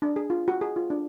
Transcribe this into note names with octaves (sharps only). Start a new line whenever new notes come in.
D4
G#4
F4
F#4
G#4
F4
D4